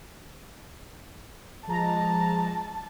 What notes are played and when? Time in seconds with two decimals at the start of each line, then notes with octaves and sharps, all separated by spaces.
1.68 F3 G#3 A5 A#5